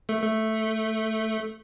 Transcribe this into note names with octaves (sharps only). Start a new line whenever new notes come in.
A3
A3